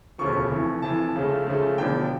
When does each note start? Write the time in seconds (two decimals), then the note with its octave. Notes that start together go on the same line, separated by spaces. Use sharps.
0.18 E1 D2 C#3 F3 C#6
0.50 F1 F2 E3
0.82 F1 F2 E3 A5
1.15 C#2 C#3 F3 A3
1.46 C#2 C#3 F3 A3
1.78 E1 E2 D3 F3 G5